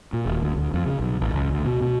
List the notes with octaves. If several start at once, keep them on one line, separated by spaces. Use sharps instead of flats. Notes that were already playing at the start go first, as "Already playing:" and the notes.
A#2
D#1
D2
D2
F2
C#3
B1
A1
C#2
D2
B2
B2